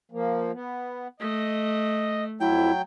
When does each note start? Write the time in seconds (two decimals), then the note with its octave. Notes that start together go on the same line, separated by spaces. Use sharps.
0.12 F3 A#3
0.53 B3
1.20 A3 D#5
2.40 F2 F#3 E4 G5